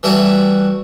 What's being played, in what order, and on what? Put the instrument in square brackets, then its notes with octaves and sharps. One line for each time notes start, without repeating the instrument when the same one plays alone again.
[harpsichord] E3 G3 A3 E4 F#4